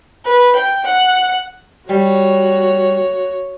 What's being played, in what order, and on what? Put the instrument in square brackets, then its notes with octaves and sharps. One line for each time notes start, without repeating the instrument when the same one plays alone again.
[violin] B4
G5
F#5
[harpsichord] G3 [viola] F#4 C#5